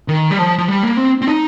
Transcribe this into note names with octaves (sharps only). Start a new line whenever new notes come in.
D#3
G3
F3
F3
G3
A#3
C4
C4
D#4